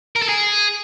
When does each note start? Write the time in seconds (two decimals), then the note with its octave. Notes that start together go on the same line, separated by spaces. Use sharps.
0.16 A#4
0.22 A4
0.29 G#4